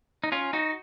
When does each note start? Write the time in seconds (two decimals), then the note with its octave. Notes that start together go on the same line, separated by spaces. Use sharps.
0.24 D#4
0.32 C#4 F4
0.53 D#4 F#4